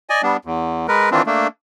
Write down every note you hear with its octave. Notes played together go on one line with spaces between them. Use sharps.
D5 D#5 G#5
G3 B3 D4
E2
G#3 A#4 B4
D#3 E3 C4 D4 F4
A3 A#3 D4